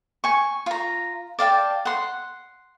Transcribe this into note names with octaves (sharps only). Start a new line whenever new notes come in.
G#5 C#6
F4 A#5
D5 F5 G5 A5
F#5 C6